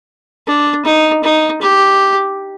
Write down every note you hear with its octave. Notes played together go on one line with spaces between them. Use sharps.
D4
D#4
D#4
G4